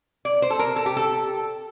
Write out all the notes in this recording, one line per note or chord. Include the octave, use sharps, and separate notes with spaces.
D5
C5
A4
A#4
A4
G4
A4